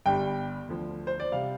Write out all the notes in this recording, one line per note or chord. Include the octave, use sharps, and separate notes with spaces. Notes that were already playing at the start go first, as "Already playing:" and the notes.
G1 G2 G3 G5
D2 D3 F3
C5
D5
C3 G3 F5